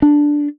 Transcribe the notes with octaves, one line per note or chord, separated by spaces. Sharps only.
D4